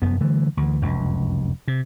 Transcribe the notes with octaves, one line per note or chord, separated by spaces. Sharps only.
F1 F#2 B3
D3 E3 G3 A3
D2 E3
F1 C#2 F#2
C3